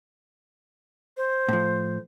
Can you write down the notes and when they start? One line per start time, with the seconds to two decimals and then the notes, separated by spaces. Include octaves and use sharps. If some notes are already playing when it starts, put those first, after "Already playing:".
1.17 C5
1.48 A2 F3